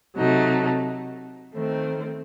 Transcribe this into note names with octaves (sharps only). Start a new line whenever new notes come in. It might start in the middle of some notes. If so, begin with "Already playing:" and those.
C3 F#3 A3 D#4
D#3 A3 C4